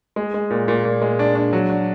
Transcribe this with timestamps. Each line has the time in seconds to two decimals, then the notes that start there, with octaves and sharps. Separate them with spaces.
0.16 G#3
0.34 G#3
0.50 A#2
0.68 A#2
0.85 A#2
1.02 G#3
1.19 D4
1.35 D4
1.53 F#3
1.70 D4